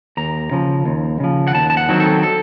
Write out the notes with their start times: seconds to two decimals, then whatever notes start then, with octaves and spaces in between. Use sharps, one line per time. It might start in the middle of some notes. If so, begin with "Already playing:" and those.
0.17 D#2 A#5
0.51 C#3 F3
0.85 D#2
1.20 C#3 F3
1.47 F#5
1.54 D#2 A5
1.70 A5
1.77 F#5
1.89 D#3 F#3 C4
2.00 A4
2.23 A4